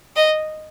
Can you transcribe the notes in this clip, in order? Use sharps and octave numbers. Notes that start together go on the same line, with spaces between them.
D#5